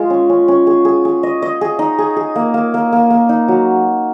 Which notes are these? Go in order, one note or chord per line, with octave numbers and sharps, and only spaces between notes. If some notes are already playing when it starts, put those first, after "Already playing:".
Already playing: G#3 F4
C#4
C#4
C#4
G#4
G#4
G#4
D#5
D#5
G#4
D#4
G#4
G#4
A#3
A#3
A#3
A#3
A#3
D#4
F#3